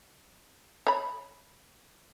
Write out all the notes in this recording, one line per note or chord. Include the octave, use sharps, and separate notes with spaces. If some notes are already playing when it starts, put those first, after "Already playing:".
C#5 B5